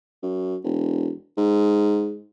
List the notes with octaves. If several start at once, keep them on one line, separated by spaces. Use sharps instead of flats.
F#2
E1
G#2